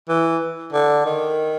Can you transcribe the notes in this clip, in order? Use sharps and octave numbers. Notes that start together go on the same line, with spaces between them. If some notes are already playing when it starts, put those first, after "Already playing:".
E3
D3
D#3